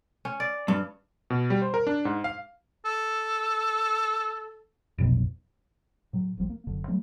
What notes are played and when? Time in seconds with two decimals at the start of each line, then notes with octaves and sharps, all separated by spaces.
0.25 C#4
0.40 D5
0.68 G2
1.30 B2
1.50 G3
1.62 C5
1.74 A#4
1.87 D4
2.05 G#2
2.24 F5
2.85 A4
4.98 F1 B1
6.13 A2 F#3
6.37 D1 A1 F3 G3
6.50 A#3
6.67 F#1 F#2 D3
6.88 E3 F#3 G3 A3